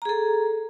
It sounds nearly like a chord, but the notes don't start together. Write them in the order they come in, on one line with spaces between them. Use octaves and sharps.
A#5 G#4 A4